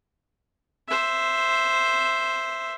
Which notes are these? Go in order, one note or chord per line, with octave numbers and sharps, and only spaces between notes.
C5 E5